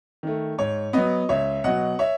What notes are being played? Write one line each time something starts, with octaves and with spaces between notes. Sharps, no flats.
D#3 A3
G#2 C#5
F#3 B3 D#5
C#2 C#5 E5
B2 F#3 D#5 F#5
C#5 E5